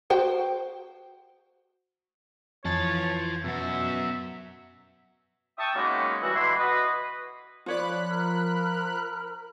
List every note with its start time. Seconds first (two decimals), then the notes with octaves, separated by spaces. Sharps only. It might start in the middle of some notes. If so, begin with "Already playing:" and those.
0.10 F#4 C5 G5
2.65 F2 E3 F4 C#5 A5 A6
3.44 F#2 B2 F#4 E5
5.58 E5 G5 A5 C#6 D#6
5.74 F#3 G#3 A#3 B3 C#4 D#4
6.21 E3 G3 E4 F#4
6.34 B2 D3 E3 E4 C6
6.58 F#4 B4 D#5
7.66 F3 F4 C#5 D5 B5 F#6
8.10 A#4